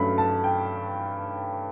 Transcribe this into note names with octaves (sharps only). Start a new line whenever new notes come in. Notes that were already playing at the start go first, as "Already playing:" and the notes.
Already playing: G2 F#3 A3 C#4 B5
A5
G5